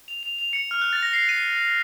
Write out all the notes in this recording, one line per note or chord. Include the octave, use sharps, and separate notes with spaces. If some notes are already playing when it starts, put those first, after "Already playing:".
F7
F7
F7
C#7
F6
F#6
A6
A#6
C7
D#7